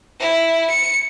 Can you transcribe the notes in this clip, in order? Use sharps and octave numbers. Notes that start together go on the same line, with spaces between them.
E4
C#7